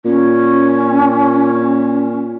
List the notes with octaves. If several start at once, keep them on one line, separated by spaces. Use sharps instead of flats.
A#2 C#4